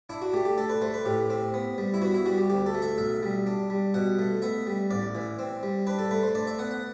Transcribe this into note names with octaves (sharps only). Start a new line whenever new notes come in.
D4 E4
F#4
A3 G4
G4
D4 A4
B4
A3 C5
B4
A2 G4
C4
B3
G3
E4
B3 F#4
E4
G3 F#4
G4
D2 G4
A4
A3
E5
B1 E5
G3
D4
G3
B2 F#5
A3
B3 E5
G3
A1 D5
E3
C4
G3
D4 B4
A4
A3 B4
C5
D4 D5
E5
B3 F#5
F#5